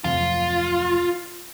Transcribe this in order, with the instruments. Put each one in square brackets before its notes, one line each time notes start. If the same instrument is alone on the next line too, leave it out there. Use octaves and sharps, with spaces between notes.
[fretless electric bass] D1 F2 C3 [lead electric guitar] F4